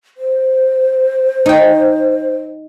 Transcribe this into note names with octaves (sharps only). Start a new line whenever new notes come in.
C5
D#4 G5